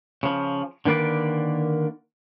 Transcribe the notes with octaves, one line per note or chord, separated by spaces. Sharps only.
C#3 F3
D3 D#3 A#3 B4 D5